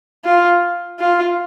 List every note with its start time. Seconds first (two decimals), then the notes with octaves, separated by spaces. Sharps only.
0.25 F4
1.00 F4